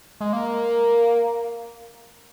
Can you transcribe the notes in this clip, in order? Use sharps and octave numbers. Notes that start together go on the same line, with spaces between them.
G#3
A#3